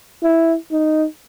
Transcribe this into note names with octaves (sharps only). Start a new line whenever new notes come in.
E4
D#4